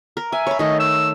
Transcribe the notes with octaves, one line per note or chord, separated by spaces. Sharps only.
A#4
E5 G#5
C#5 B5
D#3 A3 D#5
E6